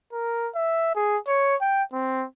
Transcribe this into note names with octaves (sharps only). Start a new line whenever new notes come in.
A#4
E5
G#4
C#5
G5
C4